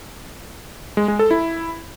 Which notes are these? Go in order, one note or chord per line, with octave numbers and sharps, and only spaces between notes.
G#3
G#3
A4
E4